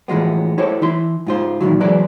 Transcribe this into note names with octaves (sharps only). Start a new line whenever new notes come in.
A2 E3 F3 G#3 B3
E4 G4 A4 C5 C#5
E3 E4 C6
G#2 F4 C5
A#2 D#3 E3 F#3
E3 F#3 G#3 B4 D5